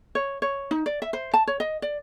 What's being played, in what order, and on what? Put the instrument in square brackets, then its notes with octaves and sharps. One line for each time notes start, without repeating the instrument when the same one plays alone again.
[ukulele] C#5
C#5
D#4
D5
E5
C5
A5
C#5
D#5
D5